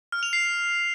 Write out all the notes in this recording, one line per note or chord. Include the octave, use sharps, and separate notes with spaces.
F6
F7
C7